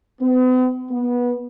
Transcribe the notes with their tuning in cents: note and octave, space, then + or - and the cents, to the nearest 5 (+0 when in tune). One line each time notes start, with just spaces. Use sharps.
B3 +45
B3 -20